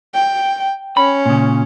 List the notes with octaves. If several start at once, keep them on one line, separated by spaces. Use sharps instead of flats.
G5
C#4 B5
A#2 C#3